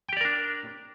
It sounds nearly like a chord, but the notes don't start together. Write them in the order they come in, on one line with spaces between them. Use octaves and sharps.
G5 G4 D5 A#4 D4